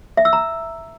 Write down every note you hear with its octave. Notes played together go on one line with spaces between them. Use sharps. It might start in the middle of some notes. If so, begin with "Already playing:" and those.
E5
E6
A#5